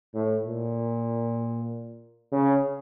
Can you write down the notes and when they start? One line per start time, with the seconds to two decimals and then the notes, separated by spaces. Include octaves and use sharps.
0.15 A2
0.45 A#2
2.32 C#3